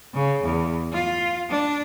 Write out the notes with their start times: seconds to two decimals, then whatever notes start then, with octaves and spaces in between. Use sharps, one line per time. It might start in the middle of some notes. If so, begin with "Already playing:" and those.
0.14 C#3
0.44 E2
0.93 F4
1.50 D4